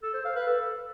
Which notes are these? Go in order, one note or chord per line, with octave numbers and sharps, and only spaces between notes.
A4
C5
F5
B4
A4